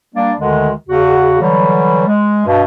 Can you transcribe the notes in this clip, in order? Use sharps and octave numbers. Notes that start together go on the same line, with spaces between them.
G3 A#3 D4 D5
D2 D3 D#3 G#3
E2 C#3 F#4
D3 E3 F#3 G3
G#3
G2 B2